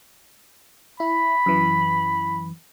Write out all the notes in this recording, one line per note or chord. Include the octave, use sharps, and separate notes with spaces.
E4 B5
F#2 E3